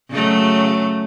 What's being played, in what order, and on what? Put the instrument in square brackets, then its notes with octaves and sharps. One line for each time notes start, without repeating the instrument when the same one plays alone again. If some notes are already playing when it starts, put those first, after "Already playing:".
[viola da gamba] C#3 F#3 A3